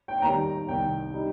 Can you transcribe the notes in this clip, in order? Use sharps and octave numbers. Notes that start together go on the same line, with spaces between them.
G5
G5
D#2 D#3 G3 A#5
C2 C3 D#3 G5
G3 D#4